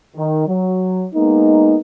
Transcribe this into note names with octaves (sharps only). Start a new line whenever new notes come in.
D#3
F#3
G#3 A#3 B3 D#4